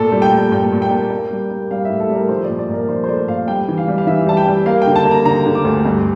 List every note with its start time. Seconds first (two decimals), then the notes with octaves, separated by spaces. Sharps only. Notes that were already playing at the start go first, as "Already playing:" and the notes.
Already playing: A#2 A3 A4
0.12 G3
0.22 G5
0.32 A#2
0.52 A#2 G5
0.72 A#2
0.82 G5
0.91 A#3
1.11 A#3
1.31 G3
1.51 A#3
1.71 G3 F5
1.85 A2 E5
2.00 A4
2.09 G3
2.15 A#4
2.29 F3 C5
2.44 D5
2.49 A#2
2.59 D5
2.69 A#2 A#4
2.89 F3 C5
3.04 C5
3.08 A3 D5
3.28 A#2 F5
3.48 G3 G5
3.68 E3
3.78 F5
3.88 G3
3.98 F5
4.07 E3 E5
4.26 G3 A5
4.37 G5
4.47 G3
4.66 A#3 F5
4.82 G5
4.87 D3
4.96 A5
5.05 A#3
5.11 A#5
5.25 D3 A#5
5.46 D3
5.55 D6
5.65 D2
5.85 G2